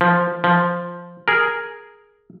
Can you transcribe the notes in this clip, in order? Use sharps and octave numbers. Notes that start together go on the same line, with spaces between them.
F3
F3
G#4 A#4